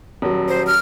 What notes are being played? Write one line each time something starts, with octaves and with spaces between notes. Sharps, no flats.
D#1 F#3
C5
F6